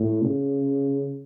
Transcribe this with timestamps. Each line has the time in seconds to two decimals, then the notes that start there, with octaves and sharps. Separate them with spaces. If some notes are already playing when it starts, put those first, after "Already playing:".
Already playing: A2
0.22 C#3